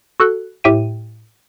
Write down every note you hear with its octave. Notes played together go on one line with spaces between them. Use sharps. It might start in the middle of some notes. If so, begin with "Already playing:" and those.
F#4 A4 F#6
A2 G4 E5 G5 D#7